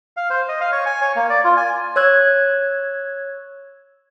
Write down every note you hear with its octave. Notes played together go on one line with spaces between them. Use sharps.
F5
C5
D#5
F5
C#5
G#5
C#5
A#3
D5
F4
G#5
C#5 E6 F#6 G#6